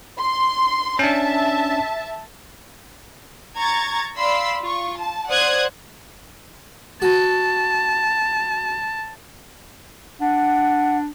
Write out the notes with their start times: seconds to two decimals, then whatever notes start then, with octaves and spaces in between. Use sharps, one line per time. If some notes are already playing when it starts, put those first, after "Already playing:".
0.19 C6
0.99 C#4 D4 E5 A5
3.58 A#5 C#6 G#6 A6
4.17 D5 F5 B5 C6 E6 B6
4.63 F4 C#6
4.98 A5
5.30 C5 D5 F#5 D#6 F#6 G#6
7.02 F#4 A5
10.21 D4 F#5